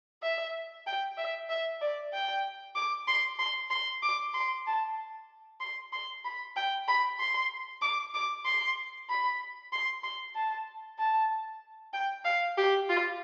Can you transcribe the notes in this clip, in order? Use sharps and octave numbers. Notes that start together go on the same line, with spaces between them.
E5
G5
E5
E5
D5
G5
D6
C6
C6
C6
D6
C6
A5
C6
C6
B5
G5
B5
C6
D6
D6
C6
B5
C6
C6
A5
A5
G5
F5
G4
F4